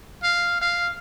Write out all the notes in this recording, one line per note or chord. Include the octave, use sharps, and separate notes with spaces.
F5
F5